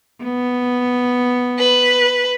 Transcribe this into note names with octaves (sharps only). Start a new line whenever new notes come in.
B3
B4